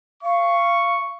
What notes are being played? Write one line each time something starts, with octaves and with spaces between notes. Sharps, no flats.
F5 C#6